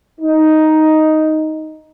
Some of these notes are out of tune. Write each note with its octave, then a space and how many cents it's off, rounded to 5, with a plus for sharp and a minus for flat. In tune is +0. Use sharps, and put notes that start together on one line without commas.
D#4 +5